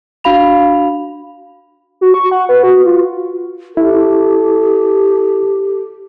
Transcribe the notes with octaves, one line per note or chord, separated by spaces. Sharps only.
D4 F#4 F5 B5 F7
F#4
C#6
F#5
B4
F#4
F4
E4 G4 A4